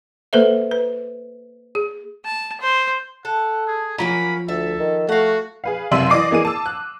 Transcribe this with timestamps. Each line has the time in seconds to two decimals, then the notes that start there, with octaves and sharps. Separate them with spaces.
0.33 A#3 A4 B4 C5 E5
0.71 B4
1.75 G#4
2.25 A5
2.61 C5
3.25 A4 F#5
3.67 G#4
3.98 F3 F#3 A#3 C#4 A#5 B5
4.48 D2 A4 E5
4.79 D#3
5.09 A3 F#4 F5 F#5
5.64 G#4 B4 F5
5.91 F#1 C3 E5 C6 F#7
6.10 E3 D5 D#5 D6 D#6 C7
6.31 E3 A#3 G#4 D#7
6.45 A5 E6
6.66 F#6